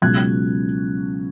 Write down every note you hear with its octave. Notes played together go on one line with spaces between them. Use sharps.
C#2 B2 F#3 F#6 G#6